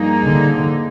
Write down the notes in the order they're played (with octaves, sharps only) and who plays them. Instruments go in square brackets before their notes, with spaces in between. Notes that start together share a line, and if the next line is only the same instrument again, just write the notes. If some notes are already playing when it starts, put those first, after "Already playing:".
Already playing: [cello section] G2 F3 A#3 D#4 G#4
[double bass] D3